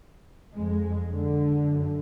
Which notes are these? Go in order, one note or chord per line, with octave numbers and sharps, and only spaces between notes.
F2 G#3
D3
F#2